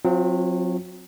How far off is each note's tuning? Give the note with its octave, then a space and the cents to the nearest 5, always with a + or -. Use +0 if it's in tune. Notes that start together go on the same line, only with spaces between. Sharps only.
F#3 -30 C4 +0 F4 +0